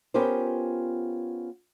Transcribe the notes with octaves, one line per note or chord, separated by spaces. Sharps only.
B3 C#4 F4 G4 A#4 C5